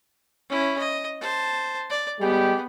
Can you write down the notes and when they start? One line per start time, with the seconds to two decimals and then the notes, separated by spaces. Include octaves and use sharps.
0.49 C#4 E4
0.79 D#5
1.21 C5 A5
1.90 D5
2.20 G3 G#3 B3 G4